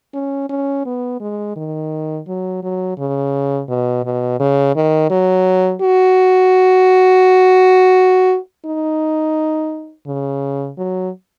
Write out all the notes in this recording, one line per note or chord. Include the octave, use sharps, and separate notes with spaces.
C#4
C#4
B3
G#3
D#3
F#3
F#3
C#3
B2
B2
C#3
D#3
F#3
F#4
D#4
C#3
F#3